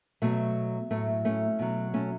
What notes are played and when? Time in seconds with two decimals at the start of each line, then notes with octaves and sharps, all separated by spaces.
0.22 B2 F#3 A3
0.90 A2 F#3 A3
1.25 A3 C#4
1.59 B2 F#3
1.94 A3 C#4